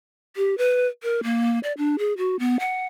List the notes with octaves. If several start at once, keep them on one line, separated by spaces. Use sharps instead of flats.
G4
B4
A#4
A#3
D5
D4
G#4
F#4
B3
F#5